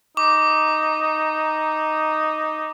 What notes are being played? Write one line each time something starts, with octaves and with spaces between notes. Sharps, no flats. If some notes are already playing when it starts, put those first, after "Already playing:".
D#4 D6